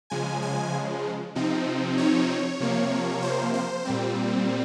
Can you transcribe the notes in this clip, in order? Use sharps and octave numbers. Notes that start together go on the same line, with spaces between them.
C#3 F3 G#3 G#5
G#5
C3 F3 C4 D#4
C#5
C3 F3 A#3
C5
C5
A#2 G3 C4